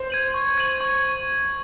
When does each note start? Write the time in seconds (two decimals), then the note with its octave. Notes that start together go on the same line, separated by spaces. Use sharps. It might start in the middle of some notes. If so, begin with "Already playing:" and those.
Already playing: C5
0.10 G#6 D#7 F#7
0.34 C#6
0.58 G#6 D#7 F#7
0.81 C#6